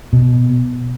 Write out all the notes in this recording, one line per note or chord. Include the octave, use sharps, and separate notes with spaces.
B2